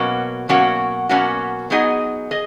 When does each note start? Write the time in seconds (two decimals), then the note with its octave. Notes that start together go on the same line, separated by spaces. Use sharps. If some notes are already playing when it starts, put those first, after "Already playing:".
Already playing: B2 F#3 A#3 C#4 F#4
0.49 B2 F#3 A#3 C#4 F#4
1.09 B2 F#3 A#3 C#4 F#4
1.70 F#3 B3 D#4 G#4 D#5
2.31 G#4 D#5